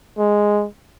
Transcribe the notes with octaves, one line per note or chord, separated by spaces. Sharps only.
G#3